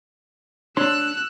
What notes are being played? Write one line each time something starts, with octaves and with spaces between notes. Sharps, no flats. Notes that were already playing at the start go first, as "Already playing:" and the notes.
D4 C#5 C6 E6 F#6